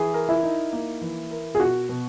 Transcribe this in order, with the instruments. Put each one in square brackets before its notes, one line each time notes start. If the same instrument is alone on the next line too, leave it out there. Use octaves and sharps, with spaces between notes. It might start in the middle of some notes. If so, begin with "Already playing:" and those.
Already playing: [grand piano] E3 [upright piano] G#4
[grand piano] A#4
[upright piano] E4
[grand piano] D#4
A#3
E3
A#4
[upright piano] G#4
[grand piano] B2 [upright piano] F#4
[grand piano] B2